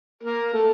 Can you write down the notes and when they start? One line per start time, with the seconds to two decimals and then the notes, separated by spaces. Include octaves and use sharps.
0.23 A#3 A#4
0.54 A3 A4